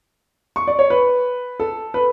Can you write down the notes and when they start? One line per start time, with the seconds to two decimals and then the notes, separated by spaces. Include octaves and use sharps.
0.56 C#6
0.67 D5
0.79 C#5
0.90 B4
1.60 A4
1.94 B4